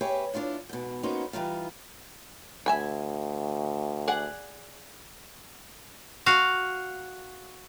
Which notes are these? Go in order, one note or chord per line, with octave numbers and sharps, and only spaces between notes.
G4 G#4 B4 C#5 E5
D4 E4 F4 C#5
G#2 B2
A#3 B3 C#4 D#4 F#4 C5
E3 G3 D#4 F4
D2 E5 G#5 B5
G#4 D5 F#5
F#4 F5